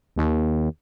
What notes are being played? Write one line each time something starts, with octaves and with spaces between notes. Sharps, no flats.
D#2